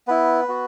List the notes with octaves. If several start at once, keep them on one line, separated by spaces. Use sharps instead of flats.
B3 E4 B4
B3 F#4